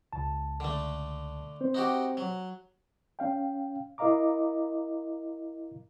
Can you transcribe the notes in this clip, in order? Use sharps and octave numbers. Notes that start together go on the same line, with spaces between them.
C#2 A5
D3 A3
C4 C5
D#4 F#4 G4
F#3
C#4 F5 G5
E4 A#4 D#5 F5 A#5 D6